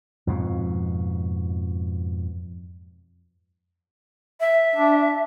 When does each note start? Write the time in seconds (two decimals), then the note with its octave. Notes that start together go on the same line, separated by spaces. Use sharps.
0.27 F2 G#2 B2
4.40 E5
4.76 D4